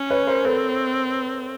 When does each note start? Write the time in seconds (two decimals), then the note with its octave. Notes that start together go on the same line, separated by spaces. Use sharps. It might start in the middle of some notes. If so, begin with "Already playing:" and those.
Already playing: C#4
0.10 B4 C#5
0.27 A#4 C5
0.45 C4 A4 B4